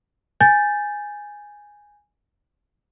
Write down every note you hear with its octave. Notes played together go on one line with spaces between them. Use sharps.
G#5 G6 A6